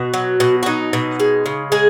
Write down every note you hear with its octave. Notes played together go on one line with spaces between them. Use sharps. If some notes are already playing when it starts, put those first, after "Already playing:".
Already playing: B2 F#4
F#3
B2
F#4
F#3 D#4
B2
G#3
C#3
G#3 G#4